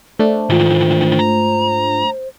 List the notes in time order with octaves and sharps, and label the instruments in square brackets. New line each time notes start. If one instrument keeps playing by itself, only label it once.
[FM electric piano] A3 D4 [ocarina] C5
[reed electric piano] G#2 F4 [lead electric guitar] D#3 E3
[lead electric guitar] A#5